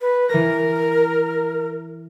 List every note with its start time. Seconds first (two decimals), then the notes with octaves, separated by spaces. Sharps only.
0.01 B4
0.29 E3 A#4 A#6